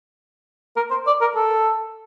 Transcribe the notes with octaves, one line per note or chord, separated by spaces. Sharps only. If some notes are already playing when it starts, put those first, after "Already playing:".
A#4
C5
D5
A#4
A4